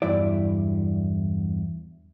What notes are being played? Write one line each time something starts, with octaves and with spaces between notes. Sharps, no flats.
E2 G2 F#3 E4 D5